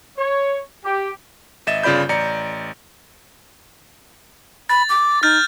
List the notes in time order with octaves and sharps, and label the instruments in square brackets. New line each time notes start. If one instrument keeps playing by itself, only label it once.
[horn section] C#5
G4
[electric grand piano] G#1 D#5 E5 A6 E7
G1 C#3 F4 D5 B5 G6
A1 D5 A#5 C#7
[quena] B5 [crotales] A6
[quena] D6
[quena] D#4 [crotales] F6 G6 A6